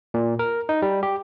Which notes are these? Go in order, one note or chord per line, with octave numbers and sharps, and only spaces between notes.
A#2
A#4
D#4
G3
G4